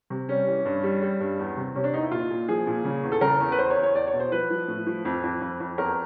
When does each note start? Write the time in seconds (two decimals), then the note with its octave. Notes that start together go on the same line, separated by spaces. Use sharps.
0.10 C3
0.29 G3 C#4
0.47 E3
0.65 G2
0.83 G3
1.02 G3
1.20 G2
1.39 E2
1.57 C3
1.75 C3 C#4
1.84 D4
1.94 E2 D#4
2.03 E4
2.11 A#2 F4
2.30 A#2
2.48 F3 G#4
2.67 A#2
2.85 C#3
3.03 E2
3.12 A4
3.21 C#3 A#4
3.40 E2
3.52 B4
3.58 E2 C5
3.70 C#5
3.76 E2
3.83 C#5
3.95 E2 D5
4.07 C#5
4.13 B2
4.20 C5
4.32 F3 B4
4.50 F3
4.68 A2
4.87 F3
5.05 F2
5.23 F2
5.41 F2
5.60 F2
5.78 E2 A#4